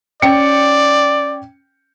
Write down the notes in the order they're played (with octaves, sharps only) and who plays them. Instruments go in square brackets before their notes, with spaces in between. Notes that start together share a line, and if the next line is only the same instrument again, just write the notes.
[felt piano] C#4 G5 C#7 [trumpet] D5